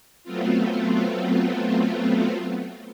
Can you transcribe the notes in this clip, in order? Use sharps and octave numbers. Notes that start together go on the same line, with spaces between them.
F#3 A3 B3 C4 F4